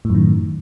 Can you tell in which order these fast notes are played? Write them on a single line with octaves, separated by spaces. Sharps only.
A2 F#2 D#3